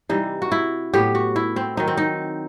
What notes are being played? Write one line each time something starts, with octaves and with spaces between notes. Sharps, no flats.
C3 E3 G3 D#4
F#4
E4
A2 F#3 B3 G4
F#4
E4
C4
D#3 F#3 C4 D#4
C4
D#4